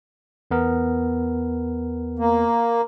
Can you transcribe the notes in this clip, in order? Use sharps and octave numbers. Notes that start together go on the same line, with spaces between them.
E2 B3 A#4
A#3